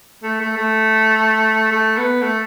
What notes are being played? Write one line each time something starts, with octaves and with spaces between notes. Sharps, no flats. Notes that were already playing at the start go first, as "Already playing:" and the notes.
A3
A3
A3
A3
B3
A3